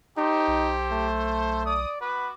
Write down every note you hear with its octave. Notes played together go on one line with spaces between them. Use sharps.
D#4 G4 A4 C5
B1
A3
D5 D#6
B3 F#4 B4 D6